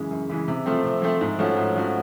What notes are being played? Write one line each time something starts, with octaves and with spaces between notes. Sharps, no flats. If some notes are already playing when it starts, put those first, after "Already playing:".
Already playing: F#2 C#3 E3 G#3
F#2
C#3 E3 G#3
C3
F3 A3 C4
C3
F3 A3 C4
G#2
F3 A3 C#4 F#4
G#2
F3 A3 C#4 F#4